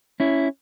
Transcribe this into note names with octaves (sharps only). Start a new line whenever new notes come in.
C#4 E4